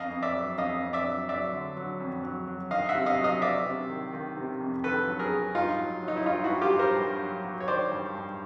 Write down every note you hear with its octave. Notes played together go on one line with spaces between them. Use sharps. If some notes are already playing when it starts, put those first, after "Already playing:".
Already playing: F2 D#5 F5
F2
D5 E5
F#3
F2 D#5 F5
F2
D5 E5
F#3
F#3 D5 E5
D3
F#3
F2
F#3
F#3
D#3 D#5 F5
E5 F#5
C3
D#5 F5
F#3
D#5 F5
F#3 D5 E5
C3
D#3
D#3
C3
F2
D#3 A4 B4
F#3
G#4 A#4
F#3
G2 D#4 F4
F#3
F#3
D#4
E4
G2 D#4 F4
E4 F#4
G2
F4 G4
G2
A#4 C5
G2
F#3
F#3
C#5
D#3 C5 D5
G2
G2